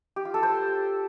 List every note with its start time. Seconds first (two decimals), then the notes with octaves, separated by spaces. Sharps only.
0.16 G4
0.25 F4
0.34 A4
0.43 C5